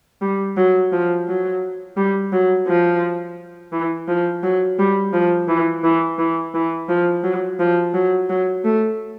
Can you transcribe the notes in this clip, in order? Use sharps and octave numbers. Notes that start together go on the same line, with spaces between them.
G3
F#3
F3
F#3
G3
F#3
F3
E3
F3
F#3
G3
F3
E3
E3
E3
E3
F3
F#3
F3
F#3
F#3
A3